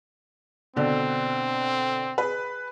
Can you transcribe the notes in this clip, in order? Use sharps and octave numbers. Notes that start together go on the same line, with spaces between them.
B2 D3 C4 D5
G#4 B4